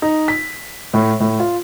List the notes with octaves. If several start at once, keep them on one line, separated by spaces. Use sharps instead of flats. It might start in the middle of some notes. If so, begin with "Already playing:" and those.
D#4
B6
A2
A2
F4